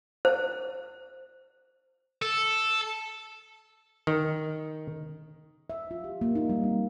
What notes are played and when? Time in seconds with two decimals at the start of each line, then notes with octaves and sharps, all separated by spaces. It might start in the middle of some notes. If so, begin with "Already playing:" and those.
0.25 C5
2.22 A4
4.07 D#3
5.70 E5
5.91 F4
6.04 G4
6.21 A#3
6.35 D#4
6.49 G3
6.63 C4